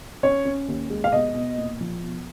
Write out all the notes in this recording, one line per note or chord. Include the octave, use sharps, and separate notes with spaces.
C#4 C#5
C#4
D#2
G#3
F5
B2 D#5
B2
A#2
F3
B2